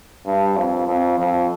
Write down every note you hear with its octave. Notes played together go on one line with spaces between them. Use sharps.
G2
F2
F2
F2